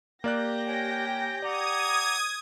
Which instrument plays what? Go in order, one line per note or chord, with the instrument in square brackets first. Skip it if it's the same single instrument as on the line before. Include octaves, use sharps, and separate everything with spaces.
[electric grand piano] A#3 D5 F#6 [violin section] G4 G6 A#6
[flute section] C#5 G5 G#5
[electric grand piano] D5 [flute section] F#5 A#5 D6 [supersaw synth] D#6 G#6